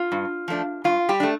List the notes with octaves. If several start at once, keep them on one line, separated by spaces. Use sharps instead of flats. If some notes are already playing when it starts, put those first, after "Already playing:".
Already playing: F4
G2
F3 A3 D4
G2 F4
G3 G4
A3 D4